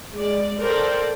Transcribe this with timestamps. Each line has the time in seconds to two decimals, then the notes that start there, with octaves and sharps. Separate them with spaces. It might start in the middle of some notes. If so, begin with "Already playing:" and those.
0.15 G#3 D5
0.60 A4 A#4 C5 D5 G5